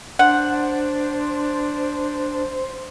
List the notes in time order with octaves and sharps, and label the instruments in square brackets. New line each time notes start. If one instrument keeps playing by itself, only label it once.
[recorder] D4 [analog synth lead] C5 [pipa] F#5